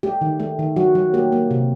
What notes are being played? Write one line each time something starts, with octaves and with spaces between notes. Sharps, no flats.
A3 G4
D#3
A3
D#3
F#3 F#4
F#3
A#3 G4
A#3
C3